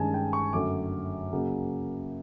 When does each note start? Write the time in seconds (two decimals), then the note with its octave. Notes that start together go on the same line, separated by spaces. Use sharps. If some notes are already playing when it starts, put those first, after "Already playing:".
Already playing: G2 D#3 G#3 C#4 G#5 A5
0.14 G5
0.33 C#6
0.53 F#2 D3 F#3 A3 D6
1.33 C#3 F#3 A#3